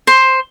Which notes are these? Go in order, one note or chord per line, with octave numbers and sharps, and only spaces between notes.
C5